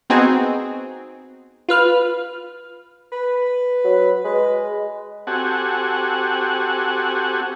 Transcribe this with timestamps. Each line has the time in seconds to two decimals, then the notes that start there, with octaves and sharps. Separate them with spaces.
0.10 B3 C4 D#4 F#4 G#4
1.69 F4 B4 F6
3.12 B4
3.85 F#3
4.24 G#3 B4
5.27 C4 F#4 G4 A4 F#5 G#5